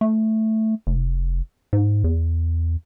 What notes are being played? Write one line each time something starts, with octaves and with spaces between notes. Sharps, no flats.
A3
F1
G#2
E2